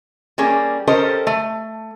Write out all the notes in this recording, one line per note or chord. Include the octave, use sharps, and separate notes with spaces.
G3 A#3 C#4 G#4
C#4 G4 A4 A#4 C5 D#5
A3